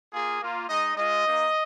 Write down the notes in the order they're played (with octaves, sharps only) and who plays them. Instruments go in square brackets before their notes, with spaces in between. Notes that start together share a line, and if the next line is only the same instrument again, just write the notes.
[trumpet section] A#3 F4 G#4
A#3 F4
G#3 D#4 D#5
G#3 F4 D#5
A#3 D#4